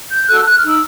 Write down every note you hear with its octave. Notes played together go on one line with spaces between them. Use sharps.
G6
F#4 A4 F#6
F#6
F6
D#4
E6